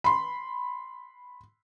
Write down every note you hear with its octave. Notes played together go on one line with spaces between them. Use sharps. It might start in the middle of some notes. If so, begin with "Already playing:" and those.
B5 C6